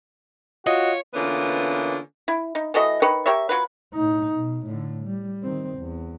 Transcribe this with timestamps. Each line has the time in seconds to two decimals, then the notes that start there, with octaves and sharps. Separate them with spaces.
0.67 F4 F#4 C#5 D#5
1.14 D3 E3 A#3 B3 C#4 F4
2.28 E4
2.55 D#4
2.74 E3 A3 F#4 D#5
3.02 D#3 B4 C#5
3.26 G4 A#4 C#5 E5
3.49 F#3 F4 B4
3.94 A2 D#4
4.34 B2
4.65 A2 D3
5.05 G3
5.43 D#3 C4
5.78 E2